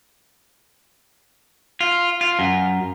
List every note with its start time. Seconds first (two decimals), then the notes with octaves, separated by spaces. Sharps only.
1.81 F4
2.21 F4
2.39 F#2